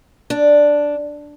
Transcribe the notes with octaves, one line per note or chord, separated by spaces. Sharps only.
D4